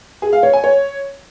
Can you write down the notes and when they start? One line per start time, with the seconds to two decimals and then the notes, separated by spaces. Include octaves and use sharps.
0.22 G#4
0.33 F5
0.43 C#5
0.53 G#5
0.64 C#5